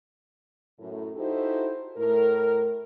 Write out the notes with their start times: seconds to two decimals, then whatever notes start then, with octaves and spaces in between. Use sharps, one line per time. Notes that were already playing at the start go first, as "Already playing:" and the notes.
0.79 F#2 A2
1.16 D#4 E4 F#4 G4 A4 C5
1.97 A2 A#4